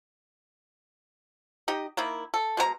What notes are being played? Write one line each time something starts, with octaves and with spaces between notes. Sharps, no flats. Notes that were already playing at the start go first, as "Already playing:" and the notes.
D#4 G4 D#5
D#3 A#3 E4
A4
B2 G#3 C#4 A#5